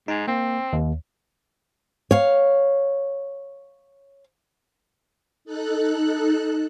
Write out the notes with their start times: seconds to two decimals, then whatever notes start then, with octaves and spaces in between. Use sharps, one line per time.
0.08 G#2 D#4
0.28 A#3 C4
0.73 D#2
2.11 C#5 F5
5.45 D#4 A4 F#6